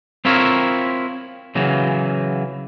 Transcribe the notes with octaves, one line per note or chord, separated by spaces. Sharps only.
C4 E4 F4 A#4 C#5
C#3 E3 F#3